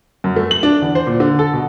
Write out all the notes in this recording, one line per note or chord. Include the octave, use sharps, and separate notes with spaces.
F#2
A3
F#7
D4
E2
C5
A#2
D3
A4
B2